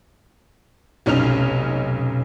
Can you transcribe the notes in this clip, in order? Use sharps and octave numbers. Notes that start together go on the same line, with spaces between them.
F1 B1 C#4 D#4 F6 F7